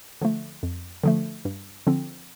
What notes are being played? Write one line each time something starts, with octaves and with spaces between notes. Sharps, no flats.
D3 F3 A3
F2
D3 F3 A3
G2
D3 F3 C4